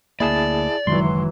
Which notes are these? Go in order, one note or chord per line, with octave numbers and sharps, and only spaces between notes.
D2 A#3 E4 G#4 D5 A5
F#1 D#3 E3 F#3 G#3 C6